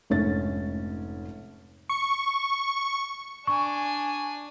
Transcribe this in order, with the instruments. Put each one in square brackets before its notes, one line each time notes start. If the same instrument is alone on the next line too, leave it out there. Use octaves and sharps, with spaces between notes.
[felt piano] F1 G#2 A3 C#4 D4 A6
[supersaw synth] C#6
[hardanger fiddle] D4 G#5 [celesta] C#6